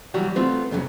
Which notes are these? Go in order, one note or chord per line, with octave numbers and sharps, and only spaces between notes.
E3 F#3 G3 F#4
A3 B3 C4 F4
C2 F2 C#3 F#3